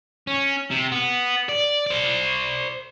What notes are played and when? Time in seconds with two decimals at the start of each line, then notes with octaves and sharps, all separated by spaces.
0.27 C#4
0.71 C3
0.92 B3
1.49 D5
1.87 C5 D5